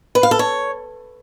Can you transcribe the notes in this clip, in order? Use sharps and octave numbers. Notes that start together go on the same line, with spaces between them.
B4
F5
A4
C#5